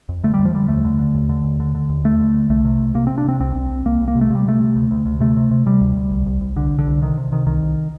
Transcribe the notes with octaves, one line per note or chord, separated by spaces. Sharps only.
F2
D3 A3
G3
F2
F3
D3 G3
D#2 A3
D3
D3
D#2
D3
D#2
D3
D3
D#2
D#2 A3
D3
D3
C2 A3
C3
C2
C3 A#3
C3 C4
D4
C3 C4
C2 C4
C2
C2
C2 A#3
C2
A#3
C3
A3
C3 G3
C3 A3
C3
D2
D2
D2
C3 A3
C3
C3
C3 G3
D2
D2
C2
C2
C2
C2 D3
C2
D3
C2
C3 D#3
C3
C3 D#3
C2 D#3
C2